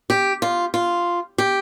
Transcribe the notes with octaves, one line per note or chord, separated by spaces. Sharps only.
G4
F4
F4
G4